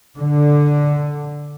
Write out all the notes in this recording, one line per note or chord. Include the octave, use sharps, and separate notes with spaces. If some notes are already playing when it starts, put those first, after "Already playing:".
D3